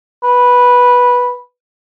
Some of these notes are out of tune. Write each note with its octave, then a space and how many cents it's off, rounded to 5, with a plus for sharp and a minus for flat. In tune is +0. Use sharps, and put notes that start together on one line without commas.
B4 -10